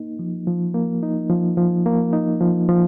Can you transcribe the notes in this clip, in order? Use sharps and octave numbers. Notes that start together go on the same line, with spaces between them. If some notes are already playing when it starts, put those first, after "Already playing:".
Already playing: A#3 D#4
F3
F3
A#3
D#4
F3
F3
A#3
D#4
F3
F3